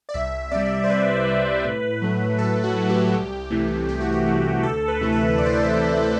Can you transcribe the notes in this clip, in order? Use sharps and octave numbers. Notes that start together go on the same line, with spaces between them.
D5
C2 E5
C3 G3 D5
C5
C2 B4
C3 G3
A2
F#3 A3
A2 A4
F#4
F#3 A3
G4
C2
C3 E3 A3
C2 G4
F#4
G4
C3 E3 A3
D2 A4
B4
C3 E3 A3
B4
D2 D5
C5
D5
E5
C3 E3 A3